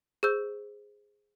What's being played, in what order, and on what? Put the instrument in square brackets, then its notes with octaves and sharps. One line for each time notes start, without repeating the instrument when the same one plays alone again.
[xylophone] G#4 C5 E6 G6